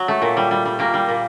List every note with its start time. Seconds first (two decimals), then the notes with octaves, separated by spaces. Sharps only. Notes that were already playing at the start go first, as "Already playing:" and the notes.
Already playing: F#3
0.08 A3
0.22 A#2
0.37 G3
0.51 G3
0.66 G3
0.79 A#2 A#3
0.94 G3
1.09 A#2